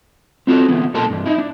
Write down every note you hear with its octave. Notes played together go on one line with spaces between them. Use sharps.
C4 F4 F#4 A4
D3 E3 B3
B1 A#2 A4 A#4 A5 C6
G2 E3
D#4 E4
D4